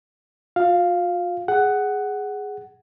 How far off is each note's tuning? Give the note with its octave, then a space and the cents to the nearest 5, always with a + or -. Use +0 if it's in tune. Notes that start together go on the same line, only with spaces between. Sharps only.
F4 +45 F5 +0
G#4 +0 F#5 +10